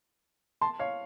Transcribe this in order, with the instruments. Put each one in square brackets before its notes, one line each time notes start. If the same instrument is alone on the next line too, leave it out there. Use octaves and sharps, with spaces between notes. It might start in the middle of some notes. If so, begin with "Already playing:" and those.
[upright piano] A5 C6
C#5 F5